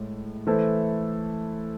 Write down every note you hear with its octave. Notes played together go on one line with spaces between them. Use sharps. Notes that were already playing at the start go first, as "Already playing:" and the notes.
Already playing: A2 G#3
E3 A3 E4 A4 C5